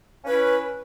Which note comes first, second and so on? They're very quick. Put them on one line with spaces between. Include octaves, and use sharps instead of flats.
C#4 B4 E4